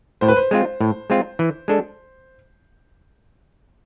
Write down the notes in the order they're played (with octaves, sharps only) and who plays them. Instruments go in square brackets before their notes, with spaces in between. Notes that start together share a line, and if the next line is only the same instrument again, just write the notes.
[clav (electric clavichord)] A2 [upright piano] C5
[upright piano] B4
C5
[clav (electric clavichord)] G#3 C4 F4
A2
G#3 C4 F4
E3
G#3 D4 A4